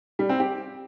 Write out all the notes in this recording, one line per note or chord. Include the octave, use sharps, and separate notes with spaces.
G3
C4
G4